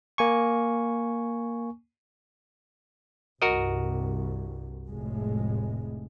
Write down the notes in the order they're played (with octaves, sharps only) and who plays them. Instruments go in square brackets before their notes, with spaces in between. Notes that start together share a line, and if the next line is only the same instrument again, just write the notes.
[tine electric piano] A#3 G#5 C#6
[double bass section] C2 G2 [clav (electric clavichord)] F#4 A#4 D#5
[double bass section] F1 A2 G#3